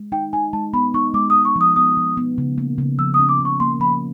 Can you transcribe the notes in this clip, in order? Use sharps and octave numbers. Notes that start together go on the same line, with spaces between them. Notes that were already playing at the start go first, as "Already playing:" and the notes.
Already playing: G#3
D#4 G5
D#4 G#5
G#3 A5
B3 B5
D#4 C#6
G#3 D6
D#6
G#3
C#6
F3 D#6
B3 D#6
F3
B3
C#3
A#3
C#3
F3 E6
D#6
C#4
D6
C#3
C#6
A#3 C6
F3 B5